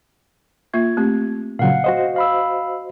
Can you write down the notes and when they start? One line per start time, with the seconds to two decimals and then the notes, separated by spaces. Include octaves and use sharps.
0.74 A#3 F4 E5 G#6
0.97 A3 C4 G4
1.59 A#2 C#3 F#3 F5 F#5
1.84 F#4 C5 D#5
2.16 F5 B5 E6